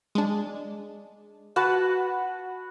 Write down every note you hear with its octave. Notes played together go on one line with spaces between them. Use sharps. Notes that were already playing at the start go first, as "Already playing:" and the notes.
G#3 D4
F#4 B4 F#5 A5